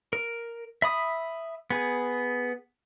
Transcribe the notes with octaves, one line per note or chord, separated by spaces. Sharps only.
A#4
E5 B5 D#6
B3 G#4